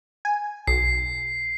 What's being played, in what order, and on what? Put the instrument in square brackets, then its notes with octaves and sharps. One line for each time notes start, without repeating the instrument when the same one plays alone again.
[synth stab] G#5
[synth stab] B1 [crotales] C7